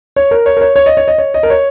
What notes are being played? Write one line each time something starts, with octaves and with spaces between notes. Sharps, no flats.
C#5
A#4
C#5
A#4
C#5
C#5
D#5
C#5
D#5
C#5
D#5
A#4
C#5